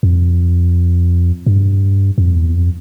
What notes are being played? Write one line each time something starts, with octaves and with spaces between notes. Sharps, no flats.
F2
G2
F2
E2
F2